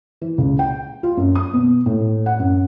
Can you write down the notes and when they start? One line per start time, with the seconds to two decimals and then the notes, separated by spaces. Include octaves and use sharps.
0.22 E3
0.38 C#2
0.59 G5
1.03 F4
1.17 F#2
1.35 D#6
1.53 B2
1.86 A2
2.26 F#5
2.39 F#2